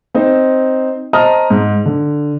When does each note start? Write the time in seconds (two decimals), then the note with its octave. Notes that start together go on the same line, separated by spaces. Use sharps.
0.14 C4 D#4 C5
1.13 C5 D#5 A5 A#5 D#6 F6
1.50 G#2
1.86 D3